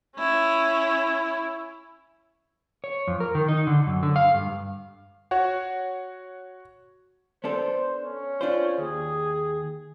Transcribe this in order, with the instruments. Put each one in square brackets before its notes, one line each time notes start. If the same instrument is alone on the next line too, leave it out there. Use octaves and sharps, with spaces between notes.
[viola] C#4 E4
[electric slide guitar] C#5
F2
A#4
D#3
D#4
D3
F#2
D3
F5
G2
[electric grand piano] F#4 C#5 F#5
[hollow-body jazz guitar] B3 D4 A4 [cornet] C5
[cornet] C#4
[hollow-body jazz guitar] D4 F4 C5
[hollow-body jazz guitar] D#2 [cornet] G#4